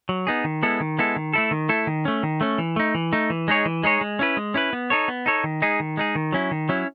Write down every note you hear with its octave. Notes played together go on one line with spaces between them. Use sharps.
F#3
B3 D#4 G#4
D#3
G#3 B3 E4 A4
D#3
G#3 B3 E4 A4
D#3
A3 E4 A4
D#3
A3 E4 A4
D#3
A3 C#4
D#3
A3 C#4
E3
A3 D#4
E3
A3 D#4
E3
G#3 D#4 G#4 C#5
E3
G#3 D#4 G#4 C#5
G#3
C#4 E4 B4
G#3
C#4 E4 B4
B3
D#4 A4 C#5
B3
D#4 A4 C#5
D#3
G#3 D#4 G#4
D#3
G#3 D#4 G#4
D#3
F#3 C#4 E4
D#3
F#3 C#4 E4